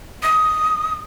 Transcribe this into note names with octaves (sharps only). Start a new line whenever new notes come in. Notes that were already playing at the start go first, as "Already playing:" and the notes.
D#6